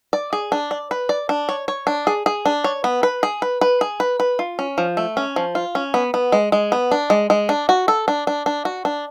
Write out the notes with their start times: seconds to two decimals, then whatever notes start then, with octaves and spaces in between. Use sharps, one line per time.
0.13 D5
0.33 G#4
0.52 D4
0.71 D5
0.91 B4
1.09 D5
1.29 D4
1.49 C#5
1.68 C#5
1.87 D4
2.07 G#4
2.26 G#4
2.46 D4
2.64 C#5
2.84 B3
3.03 B4
3.23 G#4
3.42 B4
3.61 B4
3.81 G#4
4.00 B4
4.20 B4
4.39 F4
4.59 C#4
4.78 F3
4.97 A3
5.17 C#4
5.36 F3
5.55 F4
5.75 C#4
5.94 B3
6.14 B3
6.32 G#3
6.52 G#3
6.72 B3
6.91 D4
7.10 G#3
7.30 G#3
7.49 D4
7.69 F#4
7.88 A4
8.08 D4
8.27 D4
8.46 D4
8.65 F#4
8.85 D4